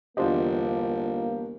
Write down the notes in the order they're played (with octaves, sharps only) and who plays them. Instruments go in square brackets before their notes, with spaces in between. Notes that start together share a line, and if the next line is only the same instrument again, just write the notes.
[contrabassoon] G1 [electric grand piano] E2 D4 G4 [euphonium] A#3 [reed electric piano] F4 C5 D#5